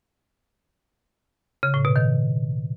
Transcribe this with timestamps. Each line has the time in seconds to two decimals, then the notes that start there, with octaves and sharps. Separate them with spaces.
1.63 C#3
1.74 A2
1.85 B2
1.96 D#3